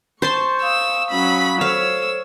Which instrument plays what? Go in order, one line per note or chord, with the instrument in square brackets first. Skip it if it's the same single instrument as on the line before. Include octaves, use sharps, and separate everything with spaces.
[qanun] C5 A5 C6 [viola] C#6
[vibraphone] F5 D#6 [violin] E6
[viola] F#3 C#4 [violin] B5
[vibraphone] A4 C5 [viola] C#5 [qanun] F5 [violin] E6